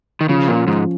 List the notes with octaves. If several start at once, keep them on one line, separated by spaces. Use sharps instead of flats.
D#3
C#3 F3
A#2 C#4 F4
G#2 F3